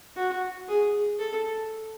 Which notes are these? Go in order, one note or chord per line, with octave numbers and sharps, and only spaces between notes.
F#4
G#4
A4